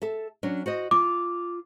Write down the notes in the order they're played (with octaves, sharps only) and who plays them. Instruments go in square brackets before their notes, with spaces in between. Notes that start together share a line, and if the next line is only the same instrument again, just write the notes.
[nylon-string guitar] A4 E5 A5
F#3 C#4 D4
F#4 C5 D#5
[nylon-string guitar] F4 [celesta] D6